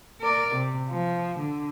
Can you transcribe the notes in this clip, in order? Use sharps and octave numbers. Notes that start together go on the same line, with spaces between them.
A#4 D5
C3
F3
D3